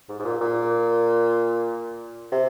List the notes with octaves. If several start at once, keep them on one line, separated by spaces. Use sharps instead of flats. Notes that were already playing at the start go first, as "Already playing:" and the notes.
G#2
G#2
A#2
A#2
C3